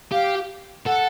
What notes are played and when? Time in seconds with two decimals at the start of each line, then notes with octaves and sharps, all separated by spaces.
0.12 G4 F5
0.86 A4 F#5